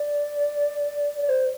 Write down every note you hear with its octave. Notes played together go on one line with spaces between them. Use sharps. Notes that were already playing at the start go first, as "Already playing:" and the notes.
Already playing: D5
D5
C5